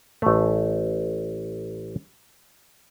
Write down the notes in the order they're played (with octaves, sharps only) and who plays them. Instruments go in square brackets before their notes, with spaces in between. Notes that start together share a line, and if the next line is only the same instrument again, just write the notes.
[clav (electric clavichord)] A1 A3